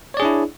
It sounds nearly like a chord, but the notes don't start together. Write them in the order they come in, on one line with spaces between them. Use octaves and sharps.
C#5 D5 G#4 D4 E4